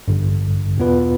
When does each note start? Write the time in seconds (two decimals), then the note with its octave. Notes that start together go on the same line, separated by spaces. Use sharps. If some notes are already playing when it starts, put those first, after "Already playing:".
0.08 A1 G2 D3
0.78 E2 B2 B3 F4 B4